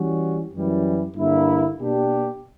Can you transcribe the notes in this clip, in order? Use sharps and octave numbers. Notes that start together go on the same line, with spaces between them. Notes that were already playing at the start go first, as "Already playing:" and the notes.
Already playing: E3 G3 C#4 F#4
F#2 E3 G3
G2 D3 A#3 E4
B2 A#3 D4 G4